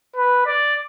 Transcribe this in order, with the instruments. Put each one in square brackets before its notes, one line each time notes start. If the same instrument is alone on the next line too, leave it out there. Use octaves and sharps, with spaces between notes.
[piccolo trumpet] B4
D5